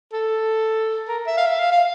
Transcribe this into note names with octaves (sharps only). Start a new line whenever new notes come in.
A4
A#4
E5
F5
E5
F5
F5